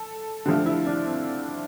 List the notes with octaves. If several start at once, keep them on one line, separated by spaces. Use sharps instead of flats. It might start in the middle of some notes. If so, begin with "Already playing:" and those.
Already playing: A4
D3 F3 A3 G4
E4
D4
C4